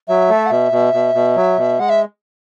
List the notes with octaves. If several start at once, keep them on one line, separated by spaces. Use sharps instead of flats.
F#3 E5
A3
F#5
B2 E5
B2
B2
B2
F#3
B2
G#3 F#5
E5